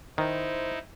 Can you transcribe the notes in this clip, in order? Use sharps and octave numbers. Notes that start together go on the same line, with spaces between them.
D#3 D#4 E4 C5